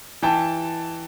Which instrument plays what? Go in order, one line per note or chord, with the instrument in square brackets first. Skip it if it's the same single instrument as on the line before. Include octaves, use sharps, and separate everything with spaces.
[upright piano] E3 G5 A5